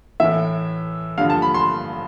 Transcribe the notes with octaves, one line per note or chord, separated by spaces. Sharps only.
A2 E3 E5
G2 D3 F3 F5
A5
B5
C6